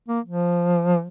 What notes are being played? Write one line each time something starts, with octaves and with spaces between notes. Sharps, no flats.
A#3
F3